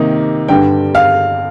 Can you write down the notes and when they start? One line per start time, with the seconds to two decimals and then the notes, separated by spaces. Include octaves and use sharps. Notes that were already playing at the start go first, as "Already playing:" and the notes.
Already playing: C3 D#3 A#3 D#4
0.48 G2 D3 G3 G5
0.95 F5